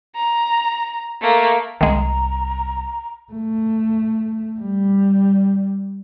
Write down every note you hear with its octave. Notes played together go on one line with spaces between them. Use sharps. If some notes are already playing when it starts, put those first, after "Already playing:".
A#5
A3 A#3
C2 D#3 G#3 D#4 A#5
A3
G3